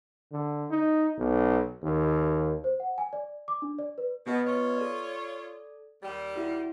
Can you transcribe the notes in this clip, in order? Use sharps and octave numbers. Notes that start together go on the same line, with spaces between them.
D3
D#4
B1
D#2
C5
F#5
G#5
D5
D6
D4
D5
B4
B2 B3 B4 D#5
F4 C#5
A4 D5
D#2 G3
E4 F#4